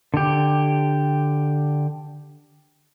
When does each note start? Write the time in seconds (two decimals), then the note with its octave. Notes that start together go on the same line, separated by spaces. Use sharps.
0.14 D3 G4